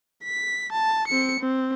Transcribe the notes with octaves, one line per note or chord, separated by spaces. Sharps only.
B6
A5
C4 C#7
C4